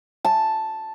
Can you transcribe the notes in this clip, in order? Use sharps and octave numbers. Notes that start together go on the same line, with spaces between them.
A5